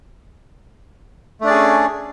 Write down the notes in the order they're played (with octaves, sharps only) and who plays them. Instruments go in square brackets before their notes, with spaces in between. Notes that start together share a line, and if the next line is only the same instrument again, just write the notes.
[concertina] A3
D4
D5
G#4
C#4